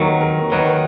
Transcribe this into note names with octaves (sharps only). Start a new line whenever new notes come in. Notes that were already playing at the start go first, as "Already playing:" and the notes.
Already playing: D#2 D#3 F#3 A#4 B4
A#4
D#2 D#3 F#3 B4